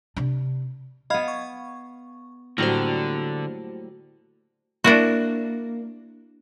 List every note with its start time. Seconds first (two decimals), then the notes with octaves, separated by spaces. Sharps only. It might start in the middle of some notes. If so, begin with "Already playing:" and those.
0.16 C3 D4
1.10 B3 D#5 F5 B5 G#6
1.28 C#6
2.58 A2 D3 F#3 G3 A#3 F#4 C5
4.84 A#3 D4 E4 F#4